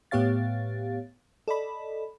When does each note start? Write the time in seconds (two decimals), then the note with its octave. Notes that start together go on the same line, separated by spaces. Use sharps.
0.11 A2 B3 G4 C#5 F5 A6
1.48 A4 D5 D#5 B5